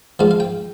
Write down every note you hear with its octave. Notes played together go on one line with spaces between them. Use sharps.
A#1 G#2 F3 F5
F5
G5